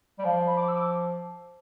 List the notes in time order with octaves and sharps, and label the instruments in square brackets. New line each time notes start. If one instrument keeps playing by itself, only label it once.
[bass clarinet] G3
[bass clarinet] F3 [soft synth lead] F5
[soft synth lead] B5
D6
E6
D6